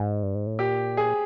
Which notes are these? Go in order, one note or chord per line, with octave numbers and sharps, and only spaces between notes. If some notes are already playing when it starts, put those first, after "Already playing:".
Already playing: G#2
G2
G#2
A2
A#2 G4
G#4